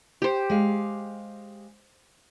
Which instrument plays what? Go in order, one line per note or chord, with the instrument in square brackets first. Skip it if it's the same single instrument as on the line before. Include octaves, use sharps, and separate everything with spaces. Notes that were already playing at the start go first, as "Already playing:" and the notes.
[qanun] G4 C5
[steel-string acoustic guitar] G#3 F5